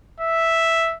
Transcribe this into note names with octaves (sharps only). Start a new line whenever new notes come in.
E5